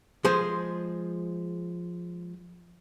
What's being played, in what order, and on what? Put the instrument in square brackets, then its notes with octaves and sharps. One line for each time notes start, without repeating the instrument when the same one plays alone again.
[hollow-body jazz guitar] F3 G#3 G#4 C5